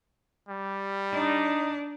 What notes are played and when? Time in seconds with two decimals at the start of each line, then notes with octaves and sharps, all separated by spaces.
0.49 G3
1.13 D4 D#4